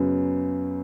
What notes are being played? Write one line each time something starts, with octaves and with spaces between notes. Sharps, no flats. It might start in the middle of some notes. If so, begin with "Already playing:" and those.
Already playing: F#2 C#3 F#3 B3